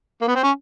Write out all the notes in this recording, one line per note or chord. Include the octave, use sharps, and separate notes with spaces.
A#3
B3
C4
C#4